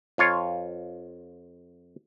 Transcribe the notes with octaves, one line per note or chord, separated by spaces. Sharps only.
F2 F4 C#5